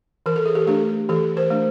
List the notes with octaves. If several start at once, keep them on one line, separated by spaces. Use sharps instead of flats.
E3 A#4
A4
G#4
G4 A4
A3 D4 G4 A4
E3 G4 A4
A#4 C5
A3 D4